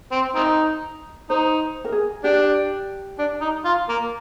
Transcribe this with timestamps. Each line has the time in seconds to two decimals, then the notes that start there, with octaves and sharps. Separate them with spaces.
0.12 C4
0.35 C4 D#4
1.30 D#4 C5
1.85 A#4
1.92 G#4
2.24 D4 G4
3.19 D4
3.41 D#4
3.65 F4
3.89 A#3